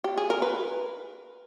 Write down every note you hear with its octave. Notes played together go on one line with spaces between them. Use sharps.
G4
G#4
A#4
B4